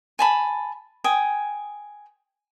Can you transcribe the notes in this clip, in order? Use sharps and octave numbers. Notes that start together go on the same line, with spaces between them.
G#5 A5 B5
G5 G#5 D#6